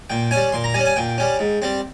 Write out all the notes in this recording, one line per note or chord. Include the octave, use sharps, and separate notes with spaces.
A#2 G5
G3 C#4 G#5
A#2 C6
A#5
G3 C#4 G#5
G#5
A#2 G5
G3 C#4
G#2
G3 C4